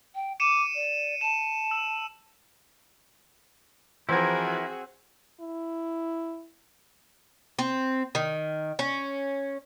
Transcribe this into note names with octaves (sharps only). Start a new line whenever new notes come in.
G5
D6 C#7 D#7 E7
D5
A5 E7
E6 D#7 F#7
E3 F3 C4 E4 F#4 G#4 A#4 G#6
E4
C4
D#3
C#4